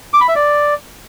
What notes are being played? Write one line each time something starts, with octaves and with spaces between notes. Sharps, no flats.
D6
B5
E5
D5